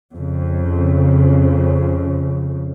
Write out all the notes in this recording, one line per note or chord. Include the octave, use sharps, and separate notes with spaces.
F2 C#3